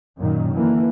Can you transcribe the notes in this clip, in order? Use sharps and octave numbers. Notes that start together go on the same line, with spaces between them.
F#2 A#2 D#3
D3 E3 A#3